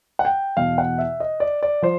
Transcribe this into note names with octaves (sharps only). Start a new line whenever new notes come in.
F#5
G5
E2 B2 F5
F#5
E5
D#5
D5
D5
F3 C5